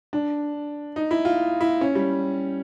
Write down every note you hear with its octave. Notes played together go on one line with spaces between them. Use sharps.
D4
D#4
E4
F4
E4
C#4
G3